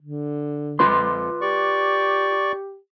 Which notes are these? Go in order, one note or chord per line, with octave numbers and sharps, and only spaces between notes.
D3
F2 F4 B4 C6
G4 D5 C#6